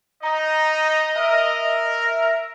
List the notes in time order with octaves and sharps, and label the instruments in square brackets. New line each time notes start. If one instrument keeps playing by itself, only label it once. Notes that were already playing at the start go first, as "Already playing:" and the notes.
[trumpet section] D#4 [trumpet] D#5 [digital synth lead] A#5
[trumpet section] A#4 [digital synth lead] E5